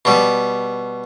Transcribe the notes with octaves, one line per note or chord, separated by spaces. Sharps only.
B2 G3